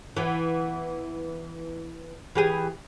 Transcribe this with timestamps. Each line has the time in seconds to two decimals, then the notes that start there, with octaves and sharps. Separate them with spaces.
0.17 E3 B3
2.35 E3 G4 G#4